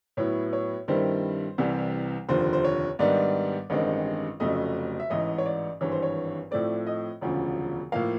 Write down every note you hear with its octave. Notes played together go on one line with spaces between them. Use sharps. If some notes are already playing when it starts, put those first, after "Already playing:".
A2 F#3 B3 E4 C#5
C#5
G2 D#3 G3 C4 E4 C5
C2 C3 E3 G3
F1 D#2 D3 F3 C5
C5
C#5
G#2 D#3 G3 B3 D4 D5
A1 G2 D#3 G#3 C4
F1 F2 C#3 F#3 A3 D#5
E5
A1 G#2 E3 D#5
C#5
D5
G#1 G2 E3 C#5
C5
C#5
A2 F3 A3 C4 D5
D#5
E1 D2 C#3 F3
A2 F3 A#3 F5